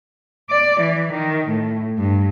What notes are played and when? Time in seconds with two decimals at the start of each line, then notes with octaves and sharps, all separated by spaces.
0.48 D5
0.80 E3
1.11 D#3
1.47 A2
1.97 G2